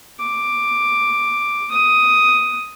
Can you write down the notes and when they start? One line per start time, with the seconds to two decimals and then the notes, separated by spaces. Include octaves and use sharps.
0.20 D6
1.71 D#6